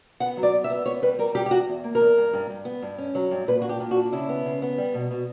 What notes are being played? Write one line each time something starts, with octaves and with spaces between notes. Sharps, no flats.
B3 F#5
F#3
D5
B3
E5
B3
B3 C#5
G3 B4
G3 A#4
G3 G4
G4
E2 F#4
E2
A#3
A#4
E2
G2
G2
G2
B3
G2
C#4
F#3
G2
A#2 B4
D4 F#4
G4
A#2
F#4
D4
C#3 E4
B3
C#3
B3
G3
B2
B2